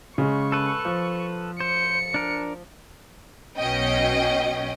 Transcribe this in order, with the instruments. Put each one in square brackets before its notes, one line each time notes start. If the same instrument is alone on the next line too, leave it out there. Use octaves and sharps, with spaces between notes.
[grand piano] C#3 G#3 [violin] C#6
[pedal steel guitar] A4 B4
[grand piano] F3
[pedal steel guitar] C5 [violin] C#7
[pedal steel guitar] D4 A#4
[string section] B1 B2 C#4 D#5 G5